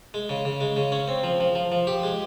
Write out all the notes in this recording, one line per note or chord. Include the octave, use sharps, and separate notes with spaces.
G#3
C#3
C#3
G#3
C#3
C#4
C4
F3
F3
F3
F3
G4
G#3